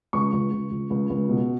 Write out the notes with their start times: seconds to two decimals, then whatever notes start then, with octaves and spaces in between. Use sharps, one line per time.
0.13 C#2 C#6
0.33 C#2
0.51 C#2
0.71 C#2
0.90 C#2
1.10 C#2
1.29 B2